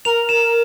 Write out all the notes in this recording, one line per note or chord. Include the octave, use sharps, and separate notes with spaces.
A#4 F7
E7